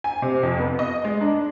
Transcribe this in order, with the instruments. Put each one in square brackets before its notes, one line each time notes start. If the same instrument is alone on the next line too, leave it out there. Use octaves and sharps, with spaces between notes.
[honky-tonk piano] G#5
C3
F2
B3
D#5
G#3
D4